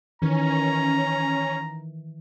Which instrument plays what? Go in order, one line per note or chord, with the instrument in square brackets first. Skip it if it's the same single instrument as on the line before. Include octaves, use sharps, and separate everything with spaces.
[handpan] D#3 E3 [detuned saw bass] C#4 [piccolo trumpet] A#5